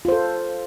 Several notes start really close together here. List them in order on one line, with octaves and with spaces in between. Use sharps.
F4 C5 A4